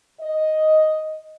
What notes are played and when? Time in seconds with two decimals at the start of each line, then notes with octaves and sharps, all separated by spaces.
0.21 D#5